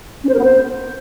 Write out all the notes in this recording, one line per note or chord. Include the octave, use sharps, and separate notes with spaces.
C#4
C5
A#4
B3
C5